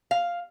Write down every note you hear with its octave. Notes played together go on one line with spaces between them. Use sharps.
F5